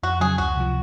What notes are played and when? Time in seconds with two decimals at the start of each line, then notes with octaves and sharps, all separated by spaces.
0.03 F2 F#4
0.20 C#3 F#3 C#4 G#4
0.38 C#2 F#4
0.56 C3 F3